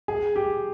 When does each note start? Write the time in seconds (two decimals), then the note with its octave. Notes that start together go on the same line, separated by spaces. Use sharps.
0.08 G#4
0.36 G4